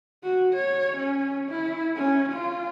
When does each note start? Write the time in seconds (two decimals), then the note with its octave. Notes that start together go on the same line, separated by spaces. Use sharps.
0.24 F#4
0.54 C#5
0.97 C#4
1.49 E4
1.97 C#4
2.32 F4